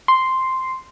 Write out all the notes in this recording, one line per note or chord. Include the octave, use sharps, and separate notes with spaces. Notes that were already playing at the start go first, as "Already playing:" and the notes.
C6